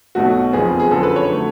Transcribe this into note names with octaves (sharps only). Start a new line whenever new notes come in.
B1 B2 A3 F#4
F#1 F2 F3 B3 G#4
G#4
F#2 D3 F3 A4
B4
C#5
D3 F#3 A3